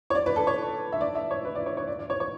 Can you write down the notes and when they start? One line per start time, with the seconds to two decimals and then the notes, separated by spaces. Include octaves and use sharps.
0.10 C#5
0.15 D5
0.26 B4
0.36 A4
0.47 C#5
0.92 E5
1.01 D5
1.15 E5
1.31 C#5
1.45 B4
1.55 D5
1.66 C#5
1.77 C#5
1.87 D5
1.99 D5
2.10 C#5
2.20 C#5